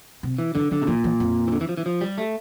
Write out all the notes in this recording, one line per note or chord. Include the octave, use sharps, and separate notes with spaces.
C3
E3
D3 E3
D3 F3
C3
A#2 E3
E3
F2
E3
D3
E3
F3
E3
F3
G3
A3